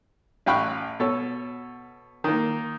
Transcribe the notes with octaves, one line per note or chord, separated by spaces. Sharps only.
A1 F5 G5 B5 C#6 F#6
B2 A4 C#5
D#3 A#3